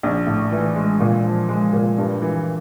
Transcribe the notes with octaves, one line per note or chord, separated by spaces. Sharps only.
A#1
A2
E3
G#3
A#2
F3
G#3
A#2
G2
E3